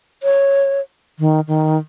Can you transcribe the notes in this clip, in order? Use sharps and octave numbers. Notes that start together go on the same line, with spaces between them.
C#5
D#3
D#3